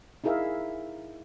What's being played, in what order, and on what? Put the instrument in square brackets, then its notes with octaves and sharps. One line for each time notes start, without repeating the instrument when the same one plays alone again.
[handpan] D#4 E4 G#4 A#4 E5 F5